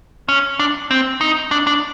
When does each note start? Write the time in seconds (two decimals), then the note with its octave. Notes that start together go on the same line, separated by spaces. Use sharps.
0.29 C#4
0.59 D4
0.91 C4
1.21 D#4
1.51 D4
1.67 D4